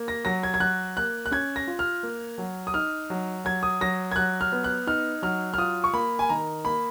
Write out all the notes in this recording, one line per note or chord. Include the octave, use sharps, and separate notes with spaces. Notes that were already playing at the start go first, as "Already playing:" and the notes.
Already playing: A#3
A#6
F#3 A#6
G#6
G#6
F#3 F#6
A#3 F#6
F#6
C#4 G#6
A#6
F4
F6
A#3
F#3
D#6
D#4 F6
F#3
F#3 G#6
D#6
F#3 A#6
G#6
F#3 F#6
F6
B3
F#6
D#4 F6
F#3 F6
F6
F4 D#6
C#6
A#3 B5
G#5
D#3 A#5
A#3 B5